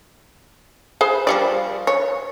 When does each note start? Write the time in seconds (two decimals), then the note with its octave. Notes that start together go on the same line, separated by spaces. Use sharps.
1.01 G#4 C5 B5
1.27 F3 G3 D5
1.87 C#5